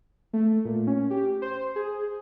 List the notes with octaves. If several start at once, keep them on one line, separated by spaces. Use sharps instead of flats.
A3
A#2
C#4
G4
C5
G#4